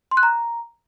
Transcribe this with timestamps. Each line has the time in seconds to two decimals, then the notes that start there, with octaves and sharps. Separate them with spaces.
0.11 C6
0.17 F#6
0.23 A#5